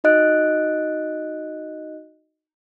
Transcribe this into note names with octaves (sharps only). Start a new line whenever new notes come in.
D#4 F#4 D#5 F#6 D7